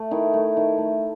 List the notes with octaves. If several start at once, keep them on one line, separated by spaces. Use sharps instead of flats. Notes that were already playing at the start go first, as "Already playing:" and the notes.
Already playing: A3
D#3 E4
A3
D#3
A3